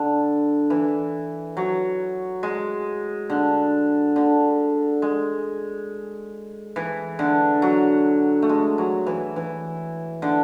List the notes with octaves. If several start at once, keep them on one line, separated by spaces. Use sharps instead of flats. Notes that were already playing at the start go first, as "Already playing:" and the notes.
Already playing: D3
E3
F#3
G#3
D3
D3
G#3
E3
D3
F#3
A3
G#3
F#3
E3
E3
D3